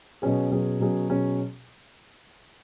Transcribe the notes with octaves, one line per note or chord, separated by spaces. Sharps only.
B2 F#3 C#4 G#4
B2 F#3 C#4 G#4
B2 F#3 C#4 G#4
B2 F#3 C#4 G#4